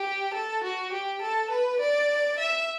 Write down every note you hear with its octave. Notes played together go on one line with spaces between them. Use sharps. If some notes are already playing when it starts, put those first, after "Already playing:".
Already playing: G4
A4
F#4
G4
A4
B4
D5
E5